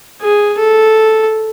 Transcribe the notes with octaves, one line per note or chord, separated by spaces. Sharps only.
G#4
A4